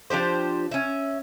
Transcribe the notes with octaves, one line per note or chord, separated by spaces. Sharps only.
F3 D4 G4 C5
C#4 E5